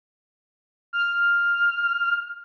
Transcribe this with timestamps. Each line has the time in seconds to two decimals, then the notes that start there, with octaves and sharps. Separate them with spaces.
0.93 F6